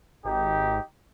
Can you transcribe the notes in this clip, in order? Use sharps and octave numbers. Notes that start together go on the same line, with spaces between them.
G#1 D#4 G4